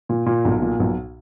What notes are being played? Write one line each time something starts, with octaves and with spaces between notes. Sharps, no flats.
A#2
A#2
B1
A#2
B1